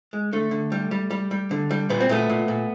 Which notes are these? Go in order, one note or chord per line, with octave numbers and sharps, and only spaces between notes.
G#3
D3 A3
D3
G3
G3
G3
G3
D3
G3
A#2 B3
C4
A#2 A3 B3
A#2
A#2